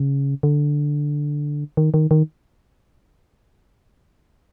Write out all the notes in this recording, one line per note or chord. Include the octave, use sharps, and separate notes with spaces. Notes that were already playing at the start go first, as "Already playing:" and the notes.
Already playing: C#3
D3
D#3
D#3
D#3